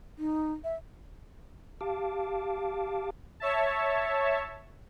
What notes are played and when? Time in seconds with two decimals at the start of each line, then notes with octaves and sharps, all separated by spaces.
0.18 D#4
0.64 E5
1.81 G4 F5 A5 D6
3.40 C#5 E5 A5